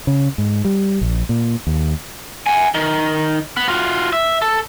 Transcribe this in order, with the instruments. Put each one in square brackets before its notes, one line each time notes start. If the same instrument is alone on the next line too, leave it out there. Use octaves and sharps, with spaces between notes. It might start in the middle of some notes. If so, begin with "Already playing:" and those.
[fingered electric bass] C#3
G#2
G3
A#1
A#2
D#2
[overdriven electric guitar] F#5 G#5
D#3
B3
F4 F#4
E5
A4